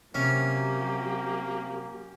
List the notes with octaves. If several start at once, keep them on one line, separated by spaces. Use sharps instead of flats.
C3 F#3 A#3 C#4 G4